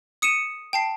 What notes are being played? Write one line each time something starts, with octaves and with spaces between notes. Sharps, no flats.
D#6 C#7 D#7 E7
G5 A5 C7